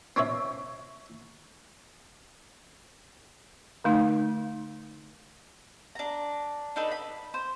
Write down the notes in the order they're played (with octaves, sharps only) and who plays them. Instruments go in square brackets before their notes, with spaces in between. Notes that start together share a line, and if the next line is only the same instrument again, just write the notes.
[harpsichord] C4 C#4 C#5 E5
[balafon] D3 A3 D#4
[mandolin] D4 A#5
D4 D#4 A4 B4
B5
C5